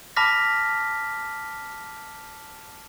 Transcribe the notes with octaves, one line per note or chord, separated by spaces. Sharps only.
A5 B5 D6 F6 A#6 B6